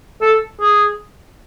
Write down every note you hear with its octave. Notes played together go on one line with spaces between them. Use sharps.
A4
G#4